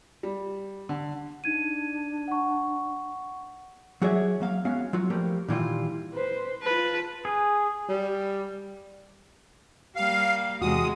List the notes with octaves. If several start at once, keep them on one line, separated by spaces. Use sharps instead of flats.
G3
D3
D4 D#4 G#6 D#7
F#5 C#6
F#3 F#4 G#4 C#5 D5 E5
F#3 A#3 F5
G#3 B3 C#4 F#4 F5
F#3 F4 F#4
F3 G3 A3 A#3
A#2 D#3 E3 G3 E4 F4
B4 C5
F4 B4 A5
G#4
G3
G3 A#3 F5
E2 C3 G#3 F#4 D#6